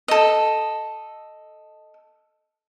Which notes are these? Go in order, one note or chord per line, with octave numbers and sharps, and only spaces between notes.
A4 D#5